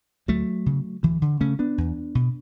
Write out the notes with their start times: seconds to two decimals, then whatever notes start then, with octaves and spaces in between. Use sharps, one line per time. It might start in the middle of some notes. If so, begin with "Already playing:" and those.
0.28 D2 F#3 A3
0.66 C#3
1.03 D2 E3
1.22 D3
1.40 C#3 A3 C#4
1.59 B3 D4
1.78 E2
2.15 B2